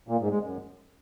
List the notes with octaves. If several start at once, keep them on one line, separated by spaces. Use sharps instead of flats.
A#2
G#2
G#3
F#2